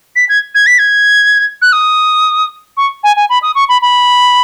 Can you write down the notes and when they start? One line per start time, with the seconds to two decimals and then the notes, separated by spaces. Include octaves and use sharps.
0.16 B6
0.29 G#6
0.55 G#6
0.67 B6
0.79 G#6
1.62 F#6
1.73 D#6
2.77 C#6
3.04 G#5
3.16 G#5
3.30 B5
3.42 D#6
3.55 C#6
3.69 B5
3.82 B5